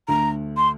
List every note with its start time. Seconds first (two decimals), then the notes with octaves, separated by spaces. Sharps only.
0.08 D2 D3 A#5
0.57 C6